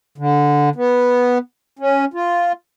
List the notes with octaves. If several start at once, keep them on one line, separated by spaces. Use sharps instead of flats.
D3
B3
C#4
F4